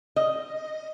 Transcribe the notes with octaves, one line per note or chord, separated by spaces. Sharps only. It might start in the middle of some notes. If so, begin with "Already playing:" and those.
D#5